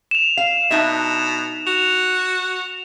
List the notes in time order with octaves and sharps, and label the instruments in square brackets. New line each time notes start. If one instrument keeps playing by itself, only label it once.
[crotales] E7 F7
[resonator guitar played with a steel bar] F5
[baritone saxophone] B2 [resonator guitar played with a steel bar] D4 D#4 E5
[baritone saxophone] F#4 [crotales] F7